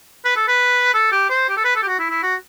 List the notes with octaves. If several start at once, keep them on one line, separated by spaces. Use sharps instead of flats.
B4
A4
B4
A4
G4
C5
G4
A4
B4
A4
G4
F#4
E4
E4
F#4